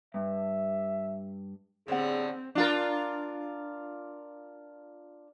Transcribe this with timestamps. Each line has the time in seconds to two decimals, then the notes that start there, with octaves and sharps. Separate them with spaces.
0.14 G2 E5
1.88 A2 D3 G3 C4 G#4 C5 F#5
2.55 D4 F4 A#4